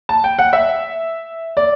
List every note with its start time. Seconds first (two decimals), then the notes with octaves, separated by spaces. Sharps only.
0.09 A5
0.24 G5
0.39 F#5
0.53 E5
1.57 D5